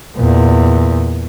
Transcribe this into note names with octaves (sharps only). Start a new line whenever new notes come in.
E2 A#2